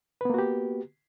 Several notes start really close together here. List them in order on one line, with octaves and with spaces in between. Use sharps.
B4 B3 A#3 F#4 G4